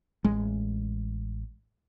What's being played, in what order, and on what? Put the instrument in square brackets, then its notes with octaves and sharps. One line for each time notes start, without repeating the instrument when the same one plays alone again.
[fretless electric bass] A1 G#3